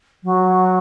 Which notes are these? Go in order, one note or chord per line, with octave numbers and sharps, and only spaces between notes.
F#3